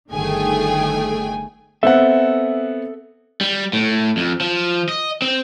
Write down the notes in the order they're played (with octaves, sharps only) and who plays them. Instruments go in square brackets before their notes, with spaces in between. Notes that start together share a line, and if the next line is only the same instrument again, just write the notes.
[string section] G1 D#3 A3 G#4 G5 G#5
[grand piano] B3 C4 F#5 [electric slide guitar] A4 E5
[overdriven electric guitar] G3
A2
F2
F3
D#5
C4